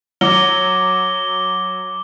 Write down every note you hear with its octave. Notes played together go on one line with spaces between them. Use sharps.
F#3 D6 G7